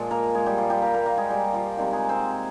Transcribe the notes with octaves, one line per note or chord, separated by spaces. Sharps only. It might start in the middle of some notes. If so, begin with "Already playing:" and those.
Already playing: A#2 F3 G#3
A#3 A#4
G#3 G#4
G3 G4
F3 F4
G3 G4
A#3 A#4
A#3 A#4
A#3 A#4
G#3 G#4
G3 G4
F3 F4
C3 D#3 G3 G#3 G4
G#3 G#4
C4 C5